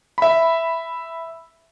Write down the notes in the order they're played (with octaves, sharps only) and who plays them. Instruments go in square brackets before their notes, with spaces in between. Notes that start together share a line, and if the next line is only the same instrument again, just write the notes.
[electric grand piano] E5 B5